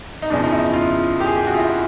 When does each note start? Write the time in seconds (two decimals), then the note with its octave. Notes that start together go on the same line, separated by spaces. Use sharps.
0.22 D#4
0.30 F#1 E2 C#3 F3 D4
0.44 D#4
0.52 E4
0.74 F4
1.20 G4
1.26 G#4
1.36 G4
1.47 F#4
1.54 F4
1.58 E4